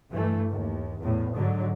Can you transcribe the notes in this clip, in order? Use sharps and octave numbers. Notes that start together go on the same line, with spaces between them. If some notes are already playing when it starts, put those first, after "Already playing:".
G2 E3 A3
D#2
E2 A2
G#2 D3 F#3